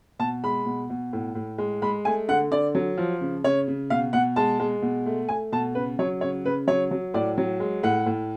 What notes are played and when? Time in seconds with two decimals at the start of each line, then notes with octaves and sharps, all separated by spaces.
0.19 B2 A5
0.44 G#3 B5
0.66 B2
0.90 B2
1.13 A2
1.35 A2
1.58 G#3
1.82 G#3 B5
2.05 A3 G#5
2.28 D3 F#5
2.51 D3 D5
2.75 F#3
2.98 F3
3.21 C#3
3.44 C#3 C#5
3.68 C#3
3.90 B2 F5
4.13 B2 F#5
4.36 G#3 A5
4.60 G#3
4.82 B2
5.06 A3
5.29 A3 G#5
5.52 B2 A5
5.75 C#3 B4
5.99 F#3 C#5
6.21 C#3 C#5
6.44 C#3 B4
6.67 F#3 C#5
6.91 F#3
7.14 A2 D5
7.37 F#3
7.60 G#3
7.83 A2 F#5
8.06 A2